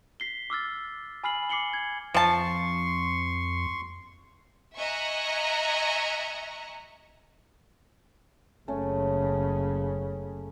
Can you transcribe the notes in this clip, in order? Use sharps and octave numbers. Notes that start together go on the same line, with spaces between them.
B6 C7 G7
D6 E6 F6 A6
G#5 B5 F6 C7 F#7
D6 C7 C#7 F#7 G7
G#6
F2 F3 A5 C6 C#6
D#5 E5 G#5 A#5 C#6 F#6
F#1 C#3 A3 C#4